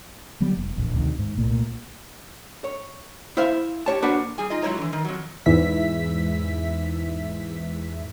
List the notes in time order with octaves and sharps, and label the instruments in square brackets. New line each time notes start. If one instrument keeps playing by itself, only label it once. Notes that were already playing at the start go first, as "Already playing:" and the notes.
[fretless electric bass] D3 F#3 G3 B3
F1
D1 A#1 E2
D2 C3 D#3
G#2
C2 A#2 A3 A#3
[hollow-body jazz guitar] C#5
E4 C5 E5 F5
G4 C#5 A5
A#3 D4 F#4 B4 C5
[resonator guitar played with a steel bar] G3 G#4 G#5
D#4 F4 D#5
F#3 G#3 E4 C5 C#5 A#5
D3 E3
D#3 A#4
F2 F#3
[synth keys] E2 G#2 E3 E5 B6